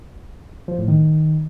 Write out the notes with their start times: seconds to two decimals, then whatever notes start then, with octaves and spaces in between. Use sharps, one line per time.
0.68 F3
0.78 A2
0.88 D#3